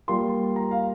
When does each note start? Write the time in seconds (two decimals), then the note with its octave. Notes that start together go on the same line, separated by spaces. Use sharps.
0.08 G3 A#3 F4 C6
0.56 A#5
0.71 F5